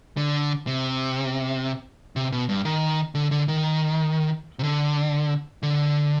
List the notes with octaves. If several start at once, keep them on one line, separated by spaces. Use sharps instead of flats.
D3
C3
C3
B2
G2
D#3
D3
D3
D#3
C3
D3
D3